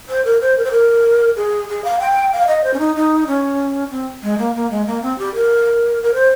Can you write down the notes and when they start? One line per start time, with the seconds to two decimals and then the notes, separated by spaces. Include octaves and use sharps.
0.09 C5
0.25 A#4
0.41 C5
0.58 A#4
0.64 C5
0.71 A#4
1.36 G#4
1.69 G#4
1.84 F5
2.00 G5
2.33 F5
2.47 D#5
2.64 C5
2.74 C#4
2.79 D#4
2.96 D#4
3.27 C#4
3.91 C4
4.23 G#3
4.38 A#3
4.55 A#3
4.71 G#3
4.87 A#3
5.02 C4
5.18 G4
5.35 A#4
6.03 A#4
6.14 C5